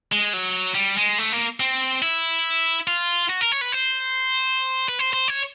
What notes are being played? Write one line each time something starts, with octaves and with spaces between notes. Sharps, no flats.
G#3
F#3
G3
G#3
A3
A#3
C4
E4
F4
F#4
A#4
C#5
B4
C5
B4
C5
C5
C#5